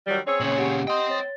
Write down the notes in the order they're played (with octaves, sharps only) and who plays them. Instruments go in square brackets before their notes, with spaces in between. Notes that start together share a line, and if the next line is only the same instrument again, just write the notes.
[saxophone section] D#3 F#3 G3
[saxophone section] C4 G#4 C#5 [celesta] C5 E6
[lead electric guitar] A#2 C#3 [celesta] F#7
[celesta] G4 F#5 D7
[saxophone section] D#5 [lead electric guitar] G5 C6
[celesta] C#5 A6